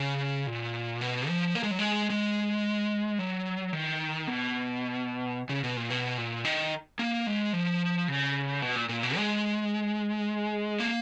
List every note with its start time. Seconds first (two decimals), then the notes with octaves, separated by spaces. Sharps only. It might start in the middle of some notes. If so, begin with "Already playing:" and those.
Already playing: C#3
0.47 A#2
1.01 B2
1.28 F3
1.55 A#3
1.63 G#3
1.71 F#3
1.79 G#3
2.10 G#3
3.19 F#3
3.73 D#3
4.27 B2
5.49 C#3
5.64 B2
5.77 A#2
5.90 B2
6.17 A#2
6.45 D#3
6.99 A#3
7.27 G#3
7.53 F3
8.08 C#3
8.62 B2
8.76 A#2
8.89 A#2
9.03 B2
9.16 G#3
10.80 A#3